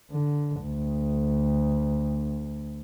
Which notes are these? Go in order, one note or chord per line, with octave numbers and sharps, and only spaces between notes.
D3
D2